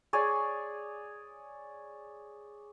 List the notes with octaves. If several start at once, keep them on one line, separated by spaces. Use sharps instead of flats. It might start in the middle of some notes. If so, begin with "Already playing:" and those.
G#4 C#5 D5 G#5